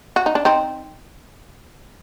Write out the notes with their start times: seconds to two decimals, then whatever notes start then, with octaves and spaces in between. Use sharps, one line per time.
0.16 F#4
0.26 D#4
0.35 D4
0.45 C4 D#4